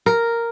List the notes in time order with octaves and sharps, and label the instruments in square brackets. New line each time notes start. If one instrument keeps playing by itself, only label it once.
[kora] A#4